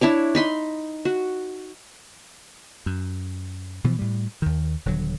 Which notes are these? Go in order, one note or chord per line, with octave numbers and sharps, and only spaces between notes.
D4 E4 C#5 D5
D#4 B5 C6
F#4
F#2
B2 E3 F3
A2 G3
D#2 D#3
D#1 D3 F#3